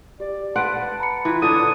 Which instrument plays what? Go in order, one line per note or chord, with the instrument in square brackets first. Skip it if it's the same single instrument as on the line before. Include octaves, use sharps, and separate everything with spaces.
[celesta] G4 [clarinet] D5
[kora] B4 F#5 [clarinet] A5 [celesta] C6 D7
[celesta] A#5 B5 C#7
[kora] E3 B4 [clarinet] F4
[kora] D3 D4 C#5 [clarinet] D#6